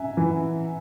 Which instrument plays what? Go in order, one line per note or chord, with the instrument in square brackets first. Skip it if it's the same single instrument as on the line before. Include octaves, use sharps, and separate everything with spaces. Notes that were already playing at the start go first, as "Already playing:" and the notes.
Already playing: [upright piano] E5 F#5 G#5 A#5
[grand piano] E3